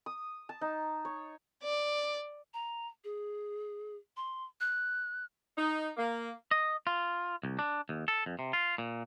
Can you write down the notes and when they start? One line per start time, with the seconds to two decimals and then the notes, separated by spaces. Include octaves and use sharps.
0.06 D#6
0.49 A5
0.61 D#4
1.05 C#5
1.63 D5
2.54 A#5
3.04 G#4
4.17 C6
4.61 F#6
5.56 D#4
5.97 A#3
6.51 D#5
6.87 F4
7.43 C2
7.59 D4
7.89 D#2
8.08 A4
8.26 F2
8.39 C3
8.53 F4
8.78 A#2